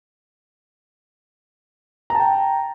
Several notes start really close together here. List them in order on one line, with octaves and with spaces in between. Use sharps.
A#5 A5 G5